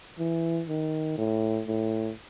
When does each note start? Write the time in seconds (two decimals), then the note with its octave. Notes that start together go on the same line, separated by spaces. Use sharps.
0.19 E3
0.68 D#3
1.18 A2
1.67 A2